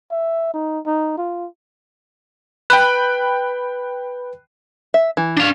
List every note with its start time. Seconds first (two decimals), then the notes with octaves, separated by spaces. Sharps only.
0.11 E5
0.54 D#4
0.86 D#4
1.18 F4
2.70 B4 G5 B5 F#6
4.94 E5
5.17 E3
5.37 D4 F5